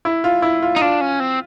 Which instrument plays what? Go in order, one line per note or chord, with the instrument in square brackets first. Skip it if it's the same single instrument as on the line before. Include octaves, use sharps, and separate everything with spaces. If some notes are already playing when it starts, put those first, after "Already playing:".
[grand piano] E4
F4
E4
F4
[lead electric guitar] D#4
[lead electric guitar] D4 [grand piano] F4
[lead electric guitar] C#4
C4